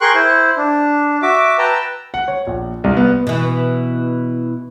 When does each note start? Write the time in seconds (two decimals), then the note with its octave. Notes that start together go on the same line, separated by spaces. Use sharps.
0.01 G#4 A#4 G5 C6 C#6 F#6
0.15 E4 C5
0.57 D4
1.22 F#4 E5 D6
1.58 B4 G5 A5 A#5 E6
2.14 F#5
2.28 C#5
2.47 A#1
2.84 C2
2.97 B3
3.27 B2 E3